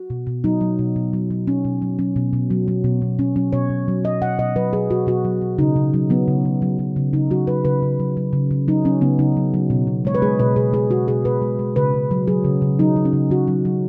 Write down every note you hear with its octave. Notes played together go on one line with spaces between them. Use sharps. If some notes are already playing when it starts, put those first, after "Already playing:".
Already playing: F#4
B2
B2
F#3 D#4
F#3
B2
B2
F#3
F#3
B2 C#4
B2
F#3
F#3 C#4
B2
B2
F#3
F#3
B2
B2
F#3 C#4
F#3 C#4
B2 C#5
B2
F#3
F#3 D#5
B2 F#5
B2 D#5
F#3 B4
F#3 G#4
B2 F#4
B2 F#4
F#3
F#3
C#3 D#4
C#3
F#3
F#3 B3
C#3
C#3
F#3
F#3
C#3
C#3 D#4
F#3 F#4
F#3 B4
C#3 B4
C#3
F#3
F#3
C#3
C#3
F#3 D#4
F#3 C#4
C#3 B3
C#3 D#4
F#3
F#3
B2
B2
G#3 C#5
B4
G#3 G#4
B2 B4
B2 G#4
G#3 G#4
G#3 F#4
B2 G#4
B2 B4
G#3
G#3
C#3 B4
C#3
F#3
F#3 G#4
C#3
C#3
F#3 D#4
F#3
C#4
C#3
C#3 F#4
F#3
F#3